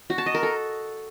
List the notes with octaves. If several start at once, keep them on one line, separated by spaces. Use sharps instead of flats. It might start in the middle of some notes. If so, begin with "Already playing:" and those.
F#4
A5
D#5
A#4
A4